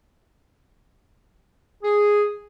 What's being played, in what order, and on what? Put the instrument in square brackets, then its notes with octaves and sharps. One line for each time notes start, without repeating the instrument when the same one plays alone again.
[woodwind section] G#4